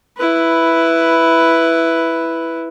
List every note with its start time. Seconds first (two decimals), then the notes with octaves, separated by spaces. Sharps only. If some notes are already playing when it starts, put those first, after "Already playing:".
0.17 E4 B4